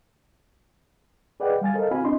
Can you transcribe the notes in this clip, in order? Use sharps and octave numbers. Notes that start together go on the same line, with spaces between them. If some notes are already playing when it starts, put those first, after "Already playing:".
G#4 B4 D5 D#5 F#5 G5
G3 F5 G#5 A6
A4 A#4 C5 D#5 F5
C4 E4 F#4 F5 G#5 B5
C4 D4 E4 D#5 C6